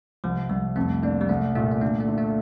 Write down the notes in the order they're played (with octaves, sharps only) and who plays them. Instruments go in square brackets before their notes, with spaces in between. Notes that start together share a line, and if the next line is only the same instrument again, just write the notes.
[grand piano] C2 [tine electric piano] F3
[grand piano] C2 [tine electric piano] G3
[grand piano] F2 [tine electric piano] A3
[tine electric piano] A#3 [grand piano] D4
[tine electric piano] G3
[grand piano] C2 [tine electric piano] A3
[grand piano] A#2 [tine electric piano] A3
[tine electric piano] A3
[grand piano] D3 [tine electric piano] A#3
[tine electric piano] A3
[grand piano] D3
[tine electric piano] A3